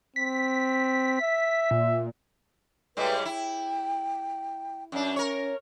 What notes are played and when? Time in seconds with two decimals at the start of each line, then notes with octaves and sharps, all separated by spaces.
0.16 C4 B6
1.22 E5
1.71 A#2
2.97 A2 G3 G#3 B4
3.25 E4 G5
4.92 F#2 C#4 D4
5.16 A#4 C#5